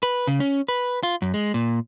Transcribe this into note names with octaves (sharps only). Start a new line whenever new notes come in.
B4
C#3
C#4
B4
F4
F#2
G#3
A#2